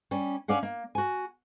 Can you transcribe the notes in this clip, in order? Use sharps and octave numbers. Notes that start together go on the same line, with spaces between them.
G3 C#4
C#4 C#5 D5 F5 F#5
A#3
F#4 G#5